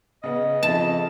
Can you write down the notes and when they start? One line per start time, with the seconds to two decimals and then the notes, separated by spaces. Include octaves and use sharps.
0.23 C#3 B3 D#5
0.63 F2 A5